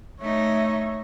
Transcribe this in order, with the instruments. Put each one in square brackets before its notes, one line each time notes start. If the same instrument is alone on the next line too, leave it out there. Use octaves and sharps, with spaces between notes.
[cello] A3 D#4 [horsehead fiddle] C#5 E5